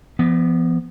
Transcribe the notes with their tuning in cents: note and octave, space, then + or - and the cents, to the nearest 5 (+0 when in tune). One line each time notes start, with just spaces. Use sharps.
F3 -40 B3 +0